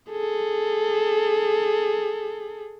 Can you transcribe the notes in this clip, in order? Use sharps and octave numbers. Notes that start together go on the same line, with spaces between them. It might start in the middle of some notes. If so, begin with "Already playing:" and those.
G#4 A4